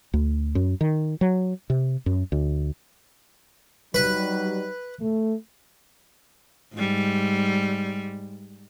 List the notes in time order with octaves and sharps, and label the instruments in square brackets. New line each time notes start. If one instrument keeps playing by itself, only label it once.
[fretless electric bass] D2
F#2
D#3
F#3
C3
F#2
D2
[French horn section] F#3 G3 D#4 [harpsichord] B4
[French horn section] A3
[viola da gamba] G#2 G3